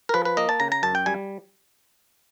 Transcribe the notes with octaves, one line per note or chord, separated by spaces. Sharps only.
A#4
F3 B4
B4
A#3 D#5
A5
C#3 A#5
A#5
F#2 A5
G5
G3 G#5